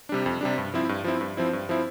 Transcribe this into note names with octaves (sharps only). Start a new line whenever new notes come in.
C3 G3 D4
F2
C3 G3 D4
G2
F3 C4 E4
G2
F3 C4 E4
G2
F3 C4 E4
G2
F3 C4 E4